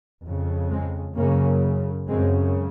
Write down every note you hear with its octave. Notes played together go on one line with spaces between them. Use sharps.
F2 C#3
G#3 C4
F#2 C#3 A#3 C#4
F#2 C#3 G#3 C4